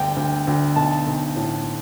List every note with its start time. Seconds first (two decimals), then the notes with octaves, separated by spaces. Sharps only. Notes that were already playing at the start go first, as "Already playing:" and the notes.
Already playing: D2 G2 G5
0.17 D2
0.47 D2
0.76 B1 A5
1.06 B1
1.36 A2